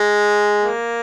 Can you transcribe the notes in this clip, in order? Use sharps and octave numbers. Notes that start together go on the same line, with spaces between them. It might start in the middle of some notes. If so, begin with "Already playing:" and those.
Already playing: G#3
A#3